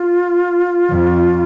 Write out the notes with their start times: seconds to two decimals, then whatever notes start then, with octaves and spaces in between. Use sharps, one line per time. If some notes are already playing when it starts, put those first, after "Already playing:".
Already playing: F4
0.90 F2